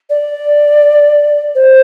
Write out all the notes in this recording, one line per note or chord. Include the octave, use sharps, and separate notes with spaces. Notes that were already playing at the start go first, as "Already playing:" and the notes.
D5
C5